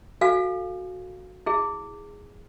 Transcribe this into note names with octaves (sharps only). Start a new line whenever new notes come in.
F#4 A4 F5 G#5
E4 G#4